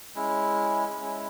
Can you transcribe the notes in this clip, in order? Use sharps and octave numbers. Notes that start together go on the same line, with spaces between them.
G#3 C#4 E4
G#3 C#4 E4